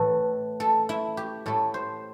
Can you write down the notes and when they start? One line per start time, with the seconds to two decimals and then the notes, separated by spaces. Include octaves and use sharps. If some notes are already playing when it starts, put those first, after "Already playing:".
Already playing: A2 E3 A3 A4
0.60 A4
0.89 E4
1.17 G4
1.46 A2 A3 A4
1.74 C5